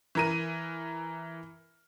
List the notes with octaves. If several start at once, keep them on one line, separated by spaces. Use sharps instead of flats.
E3 A#4 D#7